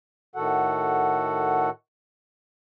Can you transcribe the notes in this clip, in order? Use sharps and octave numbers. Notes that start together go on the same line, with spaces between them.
A2 D#3 F#4 A4 F#5